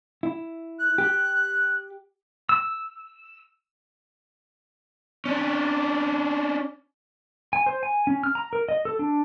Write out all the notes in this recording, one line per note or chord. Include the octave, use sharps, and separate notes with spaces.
E4
F#6
G4
E6
C#4 D4
G#5
C5
G#5
C#4
F6
A#5
A#4
D#5
A4
D4